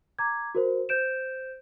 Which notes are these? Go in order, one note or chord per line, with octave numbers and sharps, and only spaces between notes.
A#5 D6 G#6
F#4 A#4 C5
C5 G6 D7 E7